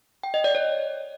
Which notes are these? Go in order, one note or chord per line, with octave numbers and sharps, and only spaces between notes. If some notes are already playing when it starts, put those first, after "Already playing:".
G5
D#5
D5
C#5